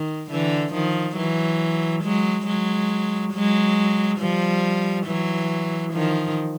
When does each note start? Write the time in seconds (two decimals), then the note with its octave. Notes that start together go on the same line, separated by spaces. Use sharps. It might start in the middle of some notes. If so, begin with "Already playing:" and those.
Already playing: D#3
0.31 D3 E3
0.73 D#3 F3
1.17 E3 F#3
2.03 F#3 G#3
2.46 F#3 G#3
3.33 F#3 G#3
4.19 F3 G3
5.06 E3 F#3
5.93 D#3 F3